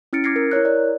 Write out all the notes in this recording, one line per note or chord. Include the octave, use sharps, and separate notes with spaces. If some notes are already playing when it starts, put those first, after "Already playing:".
C#4 E4 F6 A6 C#7 D7
D6 F6 G#6 A#6 C7 C#7
A#4
E4 A#4 C#5 F#6
D5